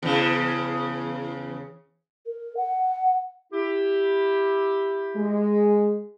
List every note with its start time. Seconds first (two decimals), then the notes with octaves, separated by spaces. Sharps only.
0.03 E2 C#3
2.26 A#4
2.57 F#5
3.52 E4 G4
5.16 G#3